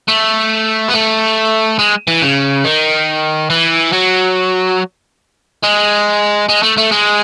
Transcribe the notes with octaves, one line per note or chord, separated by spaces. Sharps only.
A3
B3
A3
G#3
E3
C#3
D#3
E3
F#3
G#3
G#3
A3
A3
G#3